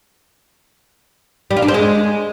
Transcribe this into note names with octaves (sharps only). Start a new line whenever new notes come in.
G3
F4
D4
C4
G#3